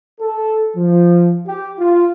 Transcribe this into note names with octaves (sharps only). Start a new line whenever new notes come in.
A4
F3
G4
F4